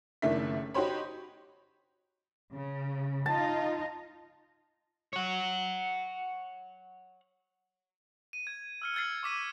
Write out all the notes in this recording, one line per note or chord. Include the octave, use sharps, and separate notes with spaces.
F#1 D#3 A3 D4 E4 B6
D#4 F#4 G4 C5 C#5 B5
C#3
D#4 F4 D#5 A5
C#5 F#5
D#7
G#6
E6 F6 C#7
E6 F6 G#6 A6 C7
C#6 D6 B6 D#7